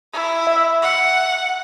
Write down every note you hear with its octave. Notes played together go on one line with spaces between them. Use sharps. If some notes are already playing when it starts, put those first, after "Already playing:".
E4
E5
F#5